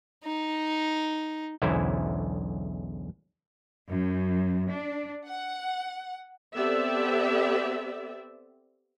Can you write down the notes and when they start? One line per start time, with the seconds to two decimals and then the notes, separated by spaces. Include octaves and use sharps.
0.24 D#4
1.62 B1 E2 D3 C#4 E4 C5
3.88 F#2
4.68 D4
5.26 F#5
6.54 B3 C4 G4 A4 D5 E5